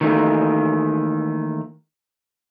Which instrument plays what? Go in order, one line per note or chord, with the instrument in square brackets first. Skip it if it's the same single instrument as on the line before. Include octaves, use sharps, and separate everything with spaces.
[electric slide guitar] D#3 E3 A3 A#3